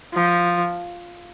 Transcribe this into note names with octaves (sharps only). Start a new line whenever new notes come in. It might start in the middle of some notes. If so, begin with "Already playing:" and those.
F3